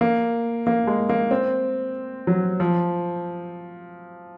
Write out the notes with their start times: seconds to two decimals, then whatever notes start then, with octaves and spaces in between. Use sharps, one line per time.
0.01 A#3
0.67 A#3
0.87 G#3
1.09 A#3
1.31 C4
2.27 F#3
2.60 F3